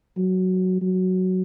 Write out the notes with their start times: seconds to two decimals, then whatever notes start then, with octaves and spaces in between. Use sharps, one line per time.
0.17 F#3
0.82 F#3